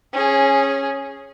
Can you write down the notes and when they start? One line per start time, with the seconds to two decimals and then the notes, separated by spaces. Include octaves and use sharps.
0.13 C#4 G#4